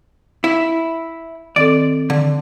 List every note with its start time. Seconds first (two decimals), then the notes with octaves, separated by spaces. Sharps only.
0.44 E4
1.56 D#3 C4 A4 D5
2.10 D3